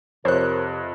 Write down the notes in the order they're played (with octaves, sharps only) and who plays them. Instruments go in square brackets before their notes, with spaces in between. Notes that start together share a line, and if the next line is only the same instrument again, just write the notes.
[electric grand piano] F2 F#6 [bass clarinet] C3 [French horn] A#4 [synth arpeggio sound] C5 C#5